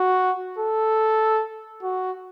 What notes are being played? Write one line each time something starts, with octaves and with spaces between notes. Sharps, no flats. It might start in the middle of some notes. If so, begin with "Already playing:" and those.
Already playing: F#4
A4
F#4